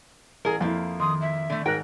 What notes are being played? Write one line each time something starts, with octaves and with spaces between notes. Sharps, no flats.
A1 G#4 A#4
F2 F3 A#3 E4
D#3 C6 D#6
E5
D3 A3
G#2 A#4 G5 F#6